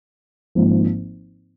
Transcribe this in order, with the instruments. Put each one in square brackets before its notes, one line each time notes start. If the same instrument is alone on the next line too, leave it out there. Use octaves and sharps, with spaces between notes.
[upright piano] G#1 G#2 F3 A#3